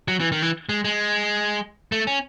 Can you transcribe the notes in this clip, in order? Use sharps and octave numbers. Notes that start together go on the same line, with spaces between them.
F#3
E3
D#3
E3
G#3
G#3
A3
C#4